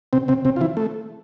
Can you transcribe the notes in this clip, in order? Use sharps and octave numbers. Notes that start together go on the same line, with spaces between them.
C3 C4
C3 C4
C3 C4
F4
E3 E4
A3